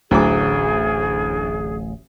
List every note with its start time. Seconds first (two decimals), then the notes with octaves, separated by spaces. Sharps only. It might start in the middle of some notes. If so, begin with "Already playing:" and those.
0.11 D1 A1 D2 E3 F#3 G#4 D6